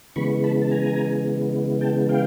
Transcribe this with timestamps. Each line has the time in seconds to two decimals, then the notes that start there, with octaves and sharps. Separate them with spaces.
0.16 C#3 E3 G#3 B3 B5 C#6
0.44 A5 B5
0.62 A5
0.71 G#5 A#5
1.81 G5 A5
2.09 F5 G5